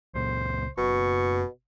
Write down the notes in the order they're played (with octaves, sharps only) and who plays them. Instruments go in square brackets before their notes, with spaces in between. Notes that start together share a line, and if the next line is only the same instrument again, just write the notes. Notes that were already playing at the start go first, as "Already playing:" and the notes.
[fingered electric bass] C#2 A#2 [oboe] C5
[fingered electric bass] F#1 [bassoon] B2 [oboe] C#6